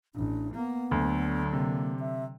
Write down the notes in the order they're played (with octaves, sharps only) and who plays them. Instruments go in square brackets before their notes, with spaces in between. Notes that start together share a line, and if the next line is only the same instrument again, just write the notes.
[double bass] A1 [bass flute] D4
[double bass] A#3 [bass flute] B3
[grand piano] D2 [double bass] D3 F#3
[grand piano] C3 [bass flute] A#3
[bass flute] E5